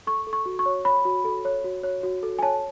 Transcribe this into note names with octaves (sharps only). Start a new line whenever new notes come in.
A4 C#6
A4
C#6
F#4
C#6
C#5
C#5 B5
F#4
A4
C#5
F#4
C#5
F#4
A4
G#5
C#5 A5